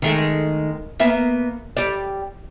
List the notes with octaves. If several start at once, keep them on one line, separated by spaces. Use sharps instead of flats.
D#3 G#3 A3
A#3 B3 E5
G3 D5